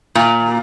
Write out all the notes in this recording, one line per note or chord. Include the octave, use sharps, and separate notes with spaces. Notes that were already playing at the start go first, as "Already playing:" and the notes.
A#2